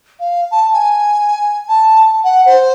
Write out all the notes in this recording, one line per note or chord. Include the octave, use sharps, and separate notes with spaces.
F5
A5
G#5
A5
F#5
C5